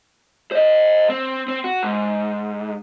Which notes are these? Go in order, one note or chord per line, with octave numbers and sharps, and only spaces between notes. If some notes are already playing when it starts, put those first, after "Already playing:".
C5 D#5
C4
C4
F#4
G#2